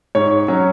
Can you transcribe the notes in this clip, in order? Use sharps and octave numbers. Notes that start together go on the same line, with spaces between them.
G#2 C#5
F#3 C#4